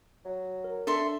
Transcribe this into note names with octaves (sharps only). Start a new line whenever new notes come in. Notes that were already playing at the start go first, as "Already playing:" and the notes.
F#3
A#4
D4 A4 E5 C6